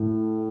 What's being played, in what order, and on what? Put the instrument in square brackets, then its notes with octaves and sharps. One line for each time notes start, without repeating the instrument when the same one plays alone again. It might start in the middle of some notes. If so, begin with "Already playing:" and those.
Already playing: [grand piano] A2 [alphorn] A3